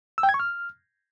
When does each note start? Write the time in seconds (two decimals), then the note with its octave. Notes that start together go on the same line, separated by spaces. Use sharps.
0.18 E6
0.23 G5
0.29 G#6
0.34 C#6
0.40 F6